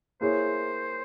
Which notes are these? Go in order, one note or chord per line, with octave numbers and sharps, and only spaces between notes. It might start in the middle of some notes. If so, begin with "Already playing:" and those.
A#3 E4 G#4 C5 C#5